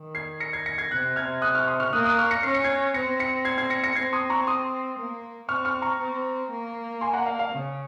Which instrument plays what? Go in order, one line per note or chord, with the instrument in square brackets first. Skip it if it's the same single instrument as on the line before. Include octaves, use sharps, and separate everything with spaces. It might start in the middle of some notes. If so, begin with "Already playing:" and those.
Already playing: [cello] D#3
[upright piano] G#6 C7
A#6 C#7
G#6 C7
A#6 C#7
G#6 C7
[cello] C3 [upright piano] F#6 A#6
[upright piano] F6 G#6
D#6 F#6
C#6 F6
C6 D#6
C#6 F6
[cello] A#3 [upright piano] D#6 F#6
[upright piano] D#6 F#6
C#6 F6
A#6 C#7
[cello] C#4 [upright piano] C7
[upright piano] C#7
G#6 C7
[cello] C4 [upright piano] A#6 C#7
[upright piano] A#6 C#7
G#6 C7
G#6 C7
A#6 C#7
A#6 C#7
[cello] C4 [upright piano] G#6 C7
[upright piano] C6 D#6
A#5 C#6
C6 D#6
[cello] A#3
[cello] C4 [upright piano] C#6 F6
[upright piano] C#6 F6
A#5 C#6
[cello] C4
A#3
[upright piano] G#5 C6
F#5 A#5
F5
F5
[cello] C#3